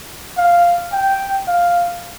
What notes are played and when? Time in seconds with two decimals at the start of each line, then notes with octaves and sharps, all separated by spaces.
0.38 F5
0.92 G5
1.48 F5